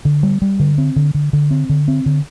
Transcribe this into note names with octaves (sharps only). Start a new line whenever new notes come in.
D3
G3
G3
D3
C4
D3
D3
D3
C4
D3
C4
D3